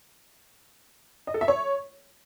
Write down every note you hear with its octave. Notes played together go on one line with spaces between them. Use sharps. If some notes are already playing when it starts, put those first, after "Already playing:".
D#5
A4
E5
C#5